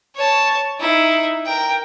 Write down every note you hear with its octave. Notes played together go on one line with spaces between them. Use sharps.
C#5 A5
D#4 E4
A#4 G5